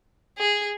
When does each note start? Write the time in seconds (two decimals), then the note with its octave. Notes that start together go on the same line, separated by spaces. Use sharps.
0.38 G#4